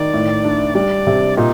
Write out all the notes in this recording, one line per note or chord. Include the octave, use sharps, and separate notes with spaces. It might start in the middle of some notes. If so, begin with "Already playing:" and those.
Already playing: D#3 D5
A2
D4
G3 D5
C3
A#2 D#4